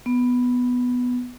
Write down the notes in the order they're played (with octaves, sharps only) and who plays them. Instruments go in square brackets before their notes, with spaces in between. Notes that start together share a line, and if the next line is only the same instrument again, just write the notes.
[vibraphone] B3